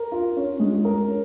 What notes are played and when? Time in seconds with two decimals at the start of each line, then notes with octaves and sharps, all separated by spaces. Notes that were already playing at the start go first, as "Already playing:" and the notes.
Already playing: A#4
0.12 F4
0.37 C#4
0.60 G#3
0.85 A#4
1.08 C#4